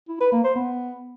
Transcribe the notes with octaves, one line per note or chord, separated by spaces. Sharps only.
E4
B4
A#3
C5
B3